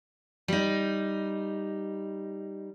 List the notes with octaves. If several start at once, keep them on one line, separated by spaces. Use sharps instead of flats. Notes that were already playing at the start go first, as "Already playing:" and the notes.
G3 D#4